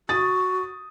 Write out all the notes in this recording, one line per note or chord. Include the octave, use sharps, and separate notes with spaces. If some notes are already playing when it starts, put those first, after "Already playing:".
F#4 D#6 A6